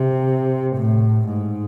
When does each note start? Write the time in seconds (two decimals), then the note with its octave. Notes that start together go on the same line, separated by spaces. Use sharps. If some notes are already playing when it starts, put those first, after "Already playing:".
Already playing: C3
0.76 A2
1.27 G#2